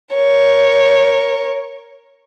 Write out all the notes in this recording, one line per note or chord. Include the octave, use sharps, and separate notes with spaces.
A#4 C#5